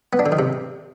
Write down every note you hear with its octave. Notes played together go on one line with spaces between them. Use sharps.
B3
D4
D3
D#3
C3